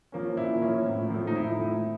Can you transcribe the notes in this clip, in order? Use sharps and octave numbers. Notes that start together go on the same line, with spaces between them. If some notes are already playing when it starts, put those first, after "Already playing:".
F3 A#3 C#4
A#2 E4
F3 A#3 C#4
A2
F3 A3
D#4
A2 E4
F3 A3